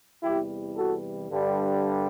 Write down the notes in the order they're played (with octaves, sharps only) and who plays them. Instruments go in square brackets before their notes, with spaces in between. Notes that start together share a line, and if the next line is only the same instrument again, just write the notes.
[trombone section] E2 C3 E3 G3 E4 G4
F#4 A4
G2 D3 G3